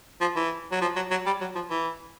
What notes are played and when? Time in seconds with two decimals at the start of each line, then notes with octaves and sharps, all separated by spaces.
0.21 F3
0.36 E3
0.72 F#3
0.81 F3
0.96 F#3
1.11 F#3
1.26 G3
1.41 F#3
1.56 F3
1.70 E3